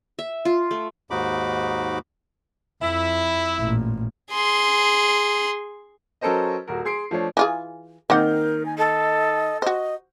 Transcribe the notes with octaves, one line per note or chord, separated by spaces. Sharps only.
E5
F4
A3
D#2 G#2 D#4 F#4 B5 D6
F2 E4
A1 A#2
G#4 C6
F#3 C#4 A4 A#4 C5 D#5
D#1 F#4 A#4
G#4 C6 C7 D7
F3 A3 D4 C#5
E3 F4 G#4
D#3 A#3 C4 D#4 A#4 F#5 G6
G#5
A4 D#5
F#4 C5 D#5